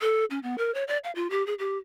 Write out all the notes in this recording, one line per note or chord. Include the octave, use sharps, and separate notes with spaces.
A4
C#4
B3
A#4
C#5
D5
F5
F4
G4
G#4
G4